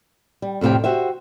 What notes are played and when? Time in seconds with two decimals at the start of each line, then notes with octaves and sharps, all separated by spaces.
0.42 G3
0.61 F2 A2 C3 F5 G5
0.84 F#4 G4 C5 E5